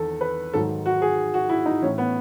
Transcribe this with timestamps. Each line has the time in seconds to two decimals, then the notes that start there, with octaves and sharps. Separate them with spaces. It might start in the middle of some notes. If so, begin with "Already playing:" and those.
Already playing: E2 D#3 A4
0.21 B4
0.54 G#2 D#3 F#3 A4
0.86 F#4
1.02 G#4
1.34 F#4
1.49 E4
1.66 D#4
1.82 A2 E3 C#4
1.98 B3